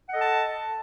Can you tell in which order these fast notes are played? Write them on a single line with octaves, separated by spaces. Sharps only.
F#5 D#5 A4 A5